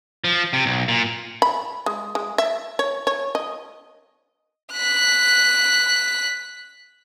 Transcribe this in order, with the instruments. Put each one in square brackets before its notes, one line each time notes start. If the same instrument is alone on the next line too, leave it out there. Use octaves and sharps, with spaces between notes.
[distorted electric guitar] F3
C3
B1
A#2
[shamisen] B5
G#3
G#3
E5
C#5
C#5
D#5
[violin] F#6 B6